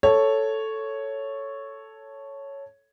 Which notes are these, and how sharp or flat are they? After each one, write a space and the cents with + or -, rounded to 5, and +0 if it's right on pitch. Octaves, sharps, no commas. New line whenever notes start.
A4 +0 C#5 +0